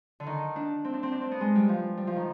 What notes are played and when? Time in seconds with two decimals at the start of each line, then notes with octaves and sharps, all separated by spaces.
0.20 D3
0.27 D#3
0.56 D4
0.84 C4
0.93 D4
1.03 C4
1.12 D4
1.21 C4
1.31 B3
1.41 G#3
1.55 G3
1.69 F3
1.97 G3
2.07 F3
2.16 D#3